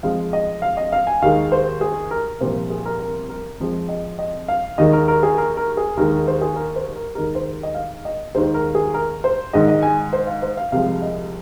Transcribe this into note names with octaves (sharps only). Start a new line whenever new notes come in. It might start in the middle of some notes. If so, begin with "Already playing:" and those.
F2 F3 G#3 F5
D#5
F5
D#5
F5
G#5
D#2 D#3 G#3 F5
C5
G#4
A#4
C2 A#2 F3 C5
G#4
A#4
A#4
A#4
F2 F3 G#3
D#5
D#5
F5
D#2 D#3 G#3 D#5
A#4
A#4
G#4
A#4
A#4
G#4
D#2 D#3 G#3 A#4
A#4
C5
G#4
A#4
C5
A#4
D#2 D#3 G#3 A#4
C5
D#5
F5
D#5
D#2 D#3 G#3 C5
A#4
G#4
A#4
C5
G#2 D#3 G#3 D#5
D#5
G#5
C5
F5
C5
F5
C2 C3 F3 G#3 F5
D#5